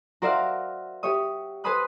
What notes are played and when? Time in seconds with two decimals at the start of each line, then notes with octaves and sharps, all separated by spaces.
0.22 F#4 A#4 C5 D5 E5 F5
1.03 G4 C#5 E5 D#6
1.64 B4 C5 G#5 B5 D#6 F#6